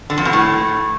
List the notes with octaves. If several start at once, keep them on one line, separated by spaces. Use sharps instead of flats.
D3
F2
B2
A2